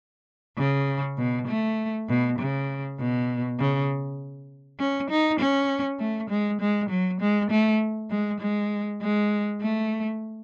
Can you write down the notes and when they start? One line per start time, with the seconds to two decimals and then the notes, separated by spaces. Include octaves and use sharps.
0.58 C#3
1.18 B2
1.47 A3
2.08 B2
2.39 C#3
2.99 B2
3.59 C#3
4.79 C#4
5.10 D#4
5.40 C#4
6.00 A3
6.30 G#3
6.61 G#3
6.90 F#3
7.21 G#3
7.51 A3
8.10 G#3
8.40 G#3
9.02 G#3
9.61 A3